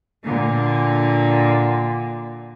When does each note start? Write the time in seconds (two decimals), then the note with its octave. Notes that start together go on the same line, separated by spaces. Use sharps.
0.25 A#2 D3